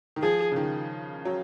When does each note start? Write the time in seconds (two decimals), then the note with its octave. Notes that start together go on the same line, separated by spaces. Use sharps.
0.16 D#3
0.22 F3 G#4
0.51 C#3
0.56 D#3
1.25 F#3